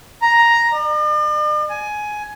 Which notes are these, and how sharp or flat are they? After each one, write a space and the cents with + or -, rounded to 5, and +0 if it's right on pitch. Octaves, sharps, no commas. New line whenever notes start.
A#5 +5
D5 +45
G#5 +15